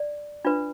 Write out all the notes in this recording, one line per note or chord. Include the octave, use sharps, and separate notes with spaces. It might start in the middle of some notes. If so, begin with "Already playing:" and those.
Already playing: D5
D4 F4 B4